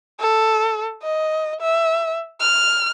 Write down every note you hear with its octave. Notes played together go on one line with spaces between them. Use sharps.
A4
D#5
E5
F6